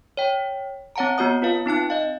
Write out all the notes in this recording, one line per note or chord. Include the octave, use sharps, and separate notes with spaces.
C#5 G5
C4 C#5 F#5 A5 A#5
B3 F#4 C#5 D#6
F4 B4 F5
C4 D#4 A5 F#6
D#5 F5